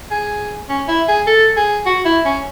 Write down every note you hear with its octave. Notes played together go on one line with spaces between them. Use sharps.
G#4
C#4
E4
G#4
A4
G#4
F#4
E4
C#4